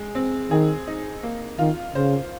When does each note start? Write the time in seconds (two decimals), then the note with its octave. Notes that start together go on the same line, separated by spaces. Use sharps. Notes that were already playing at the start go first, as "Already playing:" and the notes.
Already playing: G#3
0.15 C4
0.51 D#3 G#4
0.87 D#4
1.23 A#3
1.58 D#3 F4
1.95 C#3 C5